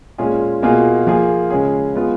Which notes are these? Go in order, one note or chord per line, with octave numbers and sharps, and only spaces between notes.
A#2 G#3 C#4 F4 G#4
B2 A#3 F4 G#4
F3 A#3 F4 G#4
C#3 G#3 C#4 G#4
G#3 B3 F4 G#4